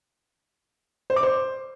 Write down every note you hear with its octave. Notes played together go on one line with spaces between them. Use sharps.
C5
D6
C5